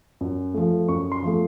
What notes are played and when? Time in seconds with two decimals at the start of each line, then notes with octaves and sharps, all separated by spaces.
0.21 F#2
0.54 F3 A3
0.88 F#2 C#6
1.12 C6
1.22 F3 A3